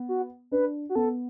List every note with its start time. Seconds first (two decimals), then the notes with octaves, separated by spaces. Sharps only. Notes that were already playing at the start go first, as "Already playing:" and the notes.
Already playing: B3
0.09 F#4
0.51 D4 B4
0.89 F#4
0.95 B3 A4